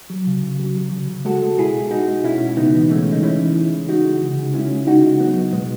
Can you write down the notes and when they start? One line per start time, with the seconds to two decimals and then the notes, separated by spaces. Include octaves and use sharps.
0.10 F#3
0.27 C#3
0.43 C#3
0.60 F#3
0.76 F#3
0.92 C#3
1.09 C#3
1.25 G#3 F#4 A4
1.42 G#3
1.58 B2 E4 G#4
1.74 B2
1.91 G#3 D#4 F#4
2.08 G#3
2.24 B2 C#4 E4
2.40 B2
2.57 C#3 B3 D#4
2.74 E3
2.89 G#3 A3 C#4
3.07 C#3
3.12 D#4
3.23 C#3 C#4 E4
3.40 E3
3.55 G#3
3.73 C#3
3.88 G#3 D#4 F#4
4.05 G#3
4.22 C#3
4.38 C#3
4.54 G#3 C#4 E4
4.71 G#3
4.87 C#3 D#4 F#4
5.03 C#3
5.20 F#3 B3 D#4
5.37 F#3
5.53 B2 G#3 B3